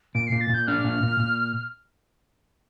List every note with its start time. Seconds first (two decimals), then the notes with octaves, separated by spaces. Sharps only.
0.15 A#2 D7
0.27 A#2 C7
0.41 A6
0.50 A#2 G6
0.67 D4 F6
0.84 A#2
1.03 A#2
1.20 A#2